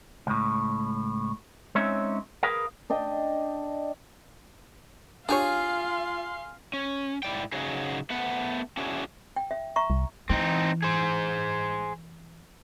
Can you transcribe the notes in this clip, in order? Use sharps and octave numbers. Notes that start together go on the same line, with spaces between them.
C#2 A2
G#3 C4 C#4 D#4 C#5 E5
G#4 A#4 B4 F5
D4 D#5 G5
D4 F4 G4 G#4 C#5 F5 G#5 C6
C#4
G#2 E4 D5 G5
C#3 F#3 D#4 F#4 G#4
A3 B3 F#5
C#4 D4 E4 F#4 G#4
G5
E5
E5 A#5 C#6
C2
E3 C4 D#4
G#4 C5